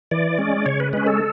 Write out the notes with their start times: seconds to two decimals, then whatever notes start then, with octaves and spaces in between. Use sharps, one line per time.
0.11 E3 D5
0.39 G#3 C#4
0.66 C#3 C#5
0.80 B4
0.93 G#3 C#4 B4
1.07 A4